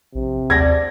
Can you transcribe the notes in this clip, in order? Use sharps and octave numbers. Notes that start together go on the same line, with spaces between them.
A#1 C3
D#2 D4 D5 F#5 G#6 A#6